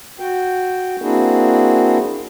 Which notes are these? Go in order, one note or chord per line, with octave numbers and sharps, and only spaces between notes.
F#4 G5
A#3 C4 D4 E4 F#4 G#4